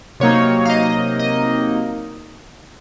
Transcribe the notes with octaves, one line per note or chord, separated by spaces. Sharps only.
C3 F#3 A#3 D#4 C#5
F5
D#5
D#5